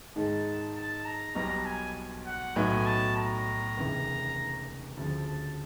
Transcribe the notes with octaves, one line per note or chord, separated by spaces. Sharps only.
G#2 D#3 G#3 A5
A5
A#5
B1 B2 G3 A#5
G#5
F#5
B1 A2 F#3 B3 D#4 G#5
A5
A#5
F1 D#2 C#3 E3
D2 C#3 F3 A5
A5